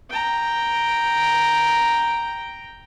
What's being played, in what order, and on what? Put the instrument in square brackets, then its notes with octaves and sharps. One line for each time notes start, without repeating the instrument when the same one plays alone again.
[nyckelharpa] G5 A#5